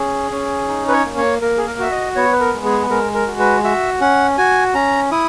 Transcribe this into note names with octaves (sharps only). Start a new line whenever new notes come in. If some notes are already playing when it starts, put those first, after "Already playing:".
Already playing: C#4 G#4
C#4
D#4
B4
C#5
A#3
C#5
A#3 A#4
G#4
A#4
F#4 E5
D#5
B3 C#5
B4
A#4
G#3
G#4
G#3 A#4
A#4
F#4
B4
F#4 E5
C#4 F#5
F#4 G#5
C#4 A#5
E4 D#6